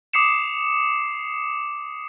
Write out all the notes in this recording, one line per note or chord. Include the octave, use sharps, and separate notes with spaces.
D6 D#6 C7 C#7 E7